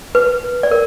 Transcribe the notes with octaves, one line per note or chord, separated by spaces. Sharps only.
B4
D5
A#4